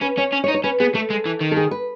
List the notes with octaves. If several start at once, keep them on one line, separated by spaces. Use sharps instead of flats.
C#4 B4
C#4 C#5
C#4
C#5
D#4
C#5
C#4 B4
B3 G#4
A3 A4
G#3
E3
D#3
A4
G#4
B4